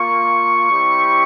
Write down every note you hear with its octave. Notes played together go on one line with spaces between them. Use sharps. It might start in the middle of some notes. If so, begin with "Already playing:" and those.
Already playing: A#3 F4 C#6
G3 C4 E4 G4